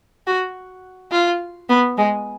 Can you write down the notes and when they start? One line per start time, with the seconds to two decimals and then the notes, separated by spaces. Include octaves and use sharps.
0.27 F#4
1.12 F4
1.69 B3
1.98 G#3